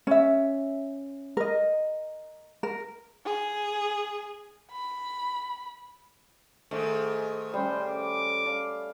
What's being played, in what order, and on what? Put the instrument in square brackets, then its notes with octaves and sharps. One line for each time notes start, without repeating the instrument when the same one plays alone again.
[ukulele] C#4 E5
A#4 D#5
A#4
[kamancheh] G#4
B5
[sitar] G#2 D#3 [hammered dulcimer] A3
[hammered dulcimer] G3 C#4 [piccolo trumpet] C5
[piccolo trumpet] D6
[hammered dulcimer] D5 F5 A5